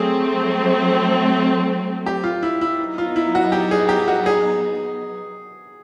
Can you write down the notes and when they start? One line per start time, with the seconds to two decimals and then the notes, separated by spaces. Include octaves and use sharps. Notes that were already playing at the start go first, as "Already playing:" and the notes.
Already playing: F#3 A3 C4 G#4
2.06 G4
2.24 F4
2.43 E4
2.61 E4
2.79 F#3 B3 D#4
2.98 F4
3.16 E4
3.35 F#4
3.52 G4
3.71 G#4
3.89 G4
4.08 F#4
4.26 G#4